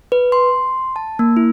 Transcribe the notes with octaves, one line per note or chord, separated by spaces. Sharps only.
B4
C6
A5
A#3
E4